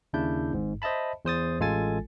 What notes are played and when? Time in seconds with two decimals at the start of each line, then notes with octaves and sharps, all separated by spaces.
0.13 D#2 C#3 D4 E4 D5 G6
0.52 G#1 G#2
0.82 C5 D#5 E5 A5 B5
1.25 E2 C5 D#6 A6
1.60 A1 G#3 F4 A4 G#5 A6